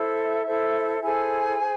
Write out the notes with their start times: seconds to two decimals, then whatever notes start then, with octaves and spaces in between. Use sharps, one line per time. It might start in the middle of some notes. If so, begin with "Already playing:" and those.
Already playing: E4 A4 C5 E5
0.46 E4 A4 C5
1.03 E4 G#4 A4 C5 G#5
1.60 C5